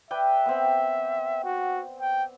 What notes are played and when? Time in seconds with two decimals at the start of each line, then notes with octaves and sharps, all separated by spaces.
0.11 B4 D5 E5 G5
0.46 B3 C4
1.44 F#4
2.00 G5